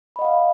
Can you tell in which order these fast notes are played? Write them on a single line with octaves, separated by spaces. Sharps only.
B5 D#5 F#5 F5